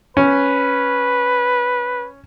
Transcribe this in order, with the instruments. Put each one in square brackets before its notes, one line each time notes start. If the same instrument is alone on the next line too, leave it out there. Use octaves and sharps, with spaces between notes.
[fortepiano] C#4 [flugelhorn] B4